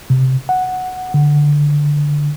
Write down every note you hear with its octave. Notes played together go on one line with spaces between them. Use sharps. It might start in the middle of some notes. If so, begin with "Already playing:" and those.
C3
F#5
D3